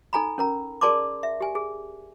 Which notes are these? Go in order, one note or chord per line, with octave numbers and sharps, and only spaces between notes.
D#4 A4 G#5 A#5 B5
C#4 A#4 A#5
G#4 A#4 D5 A5 C6 D6
E5
G4 G#5
G#4